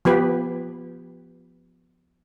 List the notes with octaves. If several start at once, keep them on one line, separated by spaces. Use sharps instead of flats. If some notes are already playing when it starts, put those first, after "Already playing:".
F3 B3 G4 B4